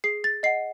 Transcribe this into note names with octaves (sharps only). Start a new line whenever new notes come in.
G#4 C7
A6
D#5 F#5 C7